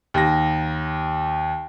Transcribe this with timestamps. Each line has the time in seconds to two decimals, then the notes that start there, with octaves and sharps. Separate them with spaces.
0.14 D#2 A#6